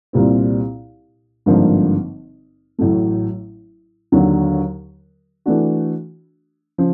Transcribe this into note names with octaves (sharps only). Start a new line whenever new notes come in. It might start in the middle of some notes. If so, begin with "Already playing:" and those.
C2 A#2 G3 C4
G#1 G2 D3 F3 A#3
A1 A2 F#3 A3
D#2 D3 F#3
E3 A3 D4 F#4
C#3 F3